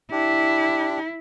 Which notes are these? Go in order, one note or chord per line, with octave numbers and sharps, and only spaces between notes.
D4 E4 G4